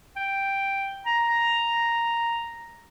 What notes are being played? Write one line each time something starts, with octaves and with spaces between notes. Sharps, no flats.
G5
A#5